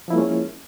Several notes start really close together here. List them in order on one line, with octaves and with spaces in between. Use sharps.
F3 E4 A#3 G#3 C#4